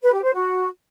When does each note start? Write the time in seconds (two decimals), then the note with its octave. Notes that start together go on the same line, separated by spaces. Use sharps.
0.03 B4
0.13 G4
0.24 C5
0.34 F#4